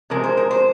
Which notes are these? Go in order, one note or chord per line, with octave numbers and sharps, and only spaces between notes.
C3 F3 G#3 A#4
C5
A#4
C5